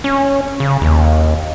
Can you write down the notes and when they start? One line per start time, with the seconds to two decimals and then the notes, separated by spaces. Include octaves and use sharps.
0.04 C#4
0.60 C#3
0.82 D#2